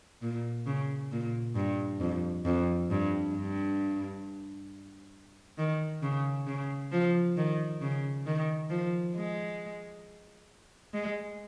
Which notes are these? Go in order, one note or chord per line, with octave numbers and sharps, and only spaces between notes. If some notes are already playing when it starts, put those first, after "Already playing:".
A#2
C#3
A#2
G2
F2
F2
G2
G2
D#3
C#3
C#3
F3
D#3
C#3
D#3
F3
G#3
G#3